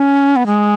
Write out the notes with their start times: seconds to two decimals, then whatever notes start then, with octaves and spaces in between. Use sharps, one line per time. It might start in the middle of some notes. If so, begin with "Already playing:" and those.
Already playing: C#4
0.36 B3
0.46 G#3